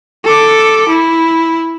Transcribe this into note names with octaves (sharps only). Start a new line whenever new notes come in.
A4 D6
E4